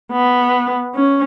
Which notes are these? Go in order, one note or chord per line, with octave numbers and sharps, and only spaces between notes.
B3
C#4